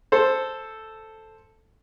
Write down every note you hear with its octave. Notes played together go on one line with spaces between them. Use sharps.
A4 C5